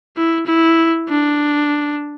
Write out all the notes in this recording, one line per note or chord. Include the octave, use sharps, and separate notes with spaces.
E4
E4
D4